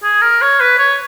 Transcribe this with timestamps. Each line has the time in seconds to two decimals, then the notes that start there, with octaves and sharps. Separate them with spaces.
0.03 G#4
0.22 A#4
0.42 C#5
0.60 B4
0.78 C#5